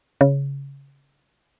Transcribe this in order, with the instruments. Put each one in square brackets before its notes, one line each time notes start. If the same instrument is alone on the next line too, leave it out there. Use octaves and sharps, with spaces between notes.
[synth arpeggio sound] C#3